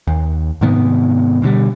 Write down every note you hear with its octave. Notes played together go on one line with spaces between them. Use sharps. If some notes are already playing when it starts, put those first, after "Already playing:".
D#2
G#2 C3 D#3 B3
B2 D3 E3 G3